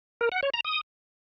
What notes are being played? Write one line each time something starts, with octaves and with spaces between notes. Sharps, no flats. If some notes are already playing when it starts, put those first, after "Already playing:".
A#4
F#5
C#5
A#5
D#6